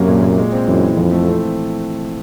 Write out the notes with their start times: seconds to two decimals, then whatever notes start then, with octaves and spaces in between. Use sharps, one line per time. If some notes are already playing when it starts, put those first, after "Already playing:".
Already playing: F#2 C3 F#3 A#3
0.08 A#2
0.22 A#2
0.38 G#3
0.52 C4
0.67 F#2 E3
0.83 E3
0.97 F2 F3
1.11 A3
1.27 C4